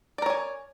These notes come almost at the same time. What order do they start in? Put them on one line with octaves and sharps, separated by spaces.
D5 A#4 C#5 G#5